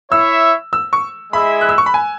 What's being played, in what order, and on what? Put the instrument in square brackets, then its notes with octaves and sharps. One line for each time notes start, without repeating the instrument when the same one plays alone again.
[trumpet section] E4 C#5 E5 [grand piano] E6
[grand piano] E6
C#6
[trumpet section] G#3 E4 G#4 E5 [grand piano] B5
[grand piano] F#6
E6
C#6
B5
G#5